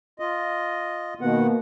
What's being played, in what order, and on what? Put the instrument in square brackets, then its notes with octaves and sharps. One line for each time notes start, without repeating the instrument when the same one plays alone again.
[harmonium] F4 D#5
[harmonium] B2 D#3 F#5 [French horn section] A#3 B3